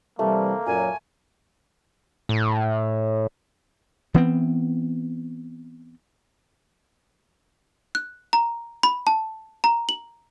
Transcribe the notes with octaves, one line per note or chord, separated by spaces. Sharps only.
C3 E3 G3 A3 A#3
F#2 A#2 F#3 G#5
A2
E3 B3 C4
F#6
A#5
B5
A5
A#5
F#7